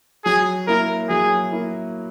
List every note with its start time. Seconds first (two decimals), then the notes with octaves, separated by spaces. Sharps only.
0.25 F#3 G#4
0.67 A#3 E4 A#4
1.09 F#3 G#4
1.52 A#3 E4